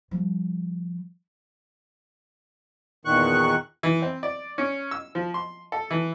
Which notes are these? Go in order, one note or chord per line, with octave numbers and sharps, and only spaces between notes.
F3 G3
E2 A#2 D#3 C#6 F#6
E3
C4
D5
C#4
E6
F3
C6
A4
E3